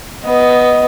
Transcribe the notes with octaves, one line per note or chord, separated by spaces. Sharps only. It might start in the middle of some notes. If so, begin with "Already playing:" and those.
B3 D#5